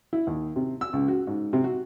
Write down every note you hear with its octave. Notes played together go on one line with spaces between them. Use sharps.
E4
D#2
C3
E6
C#2
F#4
G#2
C3
F#4